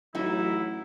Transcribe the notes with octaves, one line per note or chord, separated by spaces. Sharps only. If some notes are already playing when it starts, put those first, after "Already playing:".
A1 F#3 D#4 E4 F#4